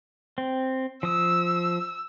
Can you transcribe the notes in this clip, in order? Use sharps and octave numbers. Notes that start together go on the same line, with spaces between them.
C4
F3 D#6 E6